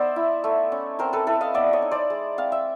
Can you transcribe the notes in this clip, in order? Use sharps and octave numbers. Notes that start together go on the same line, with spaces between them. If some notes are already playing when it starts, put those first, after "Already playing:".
Already playing: B3 D#4 C5 D5 E5
E4
A3
C#4
C4 A#4 C5
A4 B4
E4 A4 B4
D#5 F5
B3 D5 E5
C#5 D#5
D#4
C5 D5
G#3
C4 F5
E5